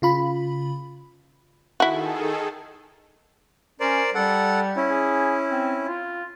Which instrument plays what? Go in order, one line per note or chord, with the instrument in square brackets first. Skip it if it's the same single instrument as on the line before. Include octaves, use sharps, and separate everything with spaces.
[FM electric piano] C#3 F4 B5
[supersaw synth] D#3 G#4 A4 [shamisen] E4 F#4
[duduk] C#4 [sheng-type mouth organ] A#4 C5 D5
[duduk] G3 [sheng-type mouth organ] A4 F#5
[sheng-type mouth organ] C#4 E4
[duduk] G#4
C4
F4